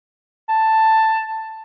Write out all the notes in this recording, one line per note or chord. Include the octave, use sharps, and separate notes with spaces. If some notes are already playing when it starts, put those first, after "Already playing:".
A5